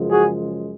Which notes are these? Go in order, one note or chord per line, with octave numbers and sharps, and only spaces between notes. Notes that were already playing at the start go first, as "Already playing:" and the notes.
Already playing: F#2 C#3 F3 G#3
F#4 G#4